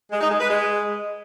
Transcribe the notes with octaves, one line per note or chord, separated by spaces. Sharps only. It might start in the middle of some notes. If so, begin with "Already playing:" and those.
G#3
D#4
G#3
B4
G#3